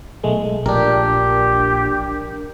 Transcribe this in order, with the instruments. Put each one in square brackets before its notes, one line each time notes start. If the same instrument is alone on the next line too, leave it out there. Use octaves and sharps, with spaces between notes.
[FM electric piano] B1 G#3 A3
[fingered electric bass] A#1 [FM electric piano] D4 A#4 [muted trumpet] G4